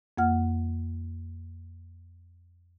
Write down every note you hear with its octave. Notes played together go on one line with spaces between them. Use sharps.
F2 A#3 F#5 F6